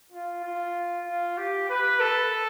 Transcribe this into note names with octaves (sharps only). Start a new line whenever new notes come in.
F4
F4
F4
G4
B4
A4